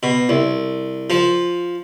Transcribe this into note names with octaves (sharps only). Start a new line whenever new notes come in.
B2
C2
F3